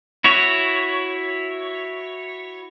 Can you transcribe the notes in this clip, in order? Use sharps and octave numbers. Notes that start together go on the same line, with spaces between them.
E4 F#4 C#5